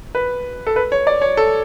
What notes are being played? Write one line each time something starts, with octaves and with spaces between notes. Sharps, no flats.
B4
A4
B4
C#5
D5
C#5
A4